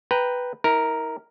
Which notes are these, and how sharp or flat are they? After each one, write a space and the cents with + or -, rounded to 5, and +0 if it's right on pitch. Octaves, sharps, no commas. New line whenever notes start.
B4 +0 G5 +0 A#5 +0
E4 -45 A#4 +0